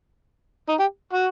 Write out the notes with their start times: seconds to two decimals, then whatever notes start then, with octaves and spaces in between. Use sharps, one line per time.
0.69 D#4
0.79 G4
1.13 F#4